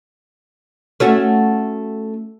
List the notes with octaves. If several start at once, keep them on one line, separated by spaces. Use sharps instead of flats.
A3 C#4 F#4